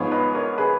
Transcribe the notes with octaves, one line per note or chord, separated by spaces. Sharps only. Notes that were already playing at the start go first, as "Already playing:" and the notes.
Already playing: G#2 F3 B3 C#5 F5
B4 D#5
A#4 C#5
G#4 B4